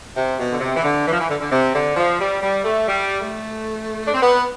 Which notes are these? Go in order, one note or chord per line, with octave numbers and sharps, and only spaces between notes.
C3
B2
D3
C3
E3
D3
E3
F3
E3
D3
D3
C3
D3
F3
G3
G3
A3
G3
A3
D4
C4
B3